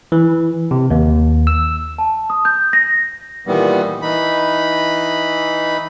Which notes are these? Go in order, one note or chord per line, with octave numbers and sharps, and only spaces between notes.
E3
C3
D#2
E6
A5
D#6
G6
A#6
A#2 D#3 E3 G3 B3
E3 D#4 B5